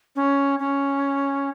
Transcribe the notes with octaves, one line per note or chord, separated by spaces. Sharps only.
C#4
C#4